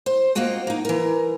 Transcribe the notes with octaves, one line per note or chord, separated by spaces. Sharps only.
C5
A#3 C4 F4 F#4 D#5
A#3 D#4
E3 A#4